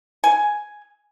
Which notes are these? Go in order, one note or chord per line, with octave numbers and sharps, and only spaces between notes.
G#5